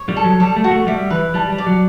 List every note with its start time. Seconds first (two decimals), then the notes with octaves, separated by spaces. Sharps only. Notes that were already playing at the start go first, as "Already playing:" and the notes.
Already playing: C#5
0.09 G3
0.16 A4
0.24 F#3
0.40 G3 A4
0.56 A3
0.64 F#4
0.71 A3
0.87 G3 E5
1.10 E3 B4
1.34 G3 A5
1.50 G3
1.58 D5
1.67 F#3